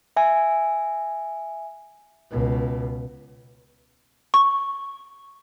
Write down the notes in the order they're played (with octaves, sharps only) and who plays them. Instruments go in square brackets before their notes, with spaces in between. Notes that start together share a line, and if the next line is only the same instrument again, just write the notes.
[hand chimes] E5 G#5
[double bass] C#2 B2
[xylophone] C#6